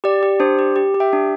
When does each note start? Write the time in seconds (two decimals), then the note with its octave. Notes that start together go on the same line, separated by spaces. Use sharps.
0.04 G4 D5
0.23 G4
0.40 D4 C5
0.59 G4
0.76 G4
0.94 G4
1.00 E5 G5
1.13 D4